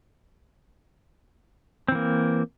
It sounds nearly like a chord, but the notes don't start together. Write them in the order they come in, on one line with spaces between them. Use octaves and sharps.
C4 E3 A#3